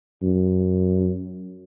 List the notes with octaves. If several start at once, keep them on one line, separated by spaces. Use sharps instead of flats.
F#2